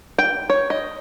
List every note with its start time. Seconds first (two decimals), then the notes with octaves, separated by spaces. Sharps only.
0.18 G5
0.50 C#5
0.70 D#5